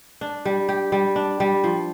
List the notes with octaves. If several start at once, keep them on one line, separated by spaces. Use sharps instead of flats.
D4
G3
G4
G3
D4
G3
F3